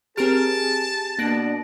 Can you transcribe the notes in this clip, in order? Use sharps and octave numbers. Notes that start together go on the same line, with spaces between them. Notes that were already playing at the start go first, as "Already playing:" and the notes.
C4 G4 G#4 A#4 A5 F6 D7
B2 A#3 D4 F#6 A#6 D7